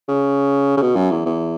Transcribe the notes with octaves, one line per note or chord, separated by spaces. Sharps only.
C#3
C#3
B2
F#2
E2
E2